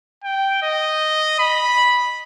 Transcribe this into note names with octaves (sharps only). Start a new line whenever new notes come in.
G5
D#5
B5